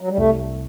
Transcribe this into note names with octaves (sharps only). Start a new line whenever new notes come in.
F#3
G3
C2 A3